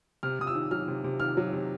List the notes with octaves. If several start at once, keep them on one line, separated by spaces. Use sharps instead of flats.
C3 F6
C3 D#6
E6
D#3
F#3 F6
C3
C3
D#3 F6
F#3
C3